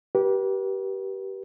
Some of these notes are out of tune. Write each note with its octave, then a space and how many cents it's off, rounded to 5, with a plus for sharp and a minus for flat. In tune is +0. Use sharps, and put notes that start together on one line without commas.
G4 -20 B4 -40